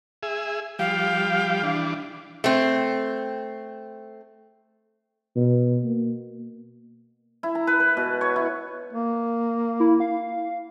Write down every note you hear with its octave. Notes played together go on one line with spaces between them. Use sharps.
G#4 E5
F3 G3 G4 F5
E3 D4
A3 C4
B2
A#3
E4
A#5
B4
B4
B2
C#5
E4
A#3
E4
F5